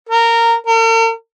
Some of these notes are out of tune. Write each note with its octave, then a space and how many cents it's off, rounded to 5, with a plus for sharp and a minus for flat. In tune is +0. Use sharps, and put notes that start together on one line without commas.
A#4 -15
A#4 -45